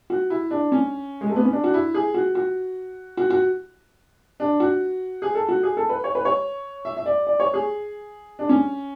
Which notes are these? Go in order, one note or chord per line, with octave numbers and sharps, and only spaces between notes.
F#4
E4
D4
C#4
G#3
A3
B3
C#4
D4
F#4
E4
G#4
F#4
F#4
F#4
F#4
D4
F#4
G#4
A4
F#4
G#4
A4
B4
C#5
B4
C#5
E5
E5
D5
D5
C#5
G#4
D4
C#4